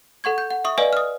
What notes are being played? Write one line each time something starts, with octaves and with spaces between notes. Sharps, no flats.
A4 F#5 C#6 G#6
G6
F#5
E5 C#6 D#6
B4 D5 D#5 F5 G#5
D#6 F6